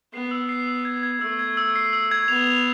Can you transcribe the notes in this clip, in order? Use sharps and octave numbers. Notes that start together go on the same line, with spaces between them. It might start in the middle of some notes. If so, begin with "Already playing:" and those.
B3 C7
E6
C7
E6
G#6
G#6
A3 E6
G#6
E6
C7
E6
G#6
B3 F7
F7